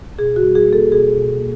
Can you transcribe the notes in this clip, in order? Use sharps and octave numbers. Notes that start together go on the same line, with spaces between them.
B2 G#4
F#4
G3
G#4
A#3
A4
B2 G#4
B2
A#3